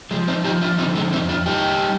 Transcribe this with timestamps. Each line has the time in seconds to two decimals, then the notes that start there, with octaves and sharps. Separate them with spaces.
0.11 F3 G#3
0.28 C4 D#4
0.44 F3 D#4 G4
0.61 D4 F4
0.78 D3 C4 D#4
0.95 G#3 C4
1.12 F2 C4 D#4
1.29 D4 F4
1.46 G3 D#4 G4